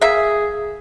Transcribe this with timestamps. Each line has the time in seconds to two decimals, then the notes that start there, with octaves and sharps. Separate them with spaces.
0.01 A#3 G#4 E5